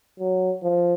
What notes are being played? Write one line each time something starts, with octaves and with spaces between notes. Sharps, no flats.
F#3
F3